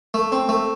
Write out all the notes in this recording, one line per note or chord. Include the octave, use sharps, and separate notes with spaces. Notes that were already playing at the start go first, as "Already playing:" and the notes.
A3
C4
A3